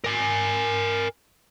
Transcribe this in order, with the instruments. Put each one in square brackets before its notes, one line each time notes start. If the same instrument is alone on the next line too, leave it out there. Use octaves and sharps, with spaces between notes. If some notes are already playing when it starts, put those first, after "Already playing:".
[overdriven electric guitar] A#4 G#5